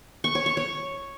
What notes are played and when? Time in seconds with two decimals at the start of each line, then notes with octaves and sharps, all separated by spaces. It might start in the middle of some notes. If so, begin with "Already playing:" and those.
0.24 C#6
0.35 C#5
0.46 C#6
0.57 C#5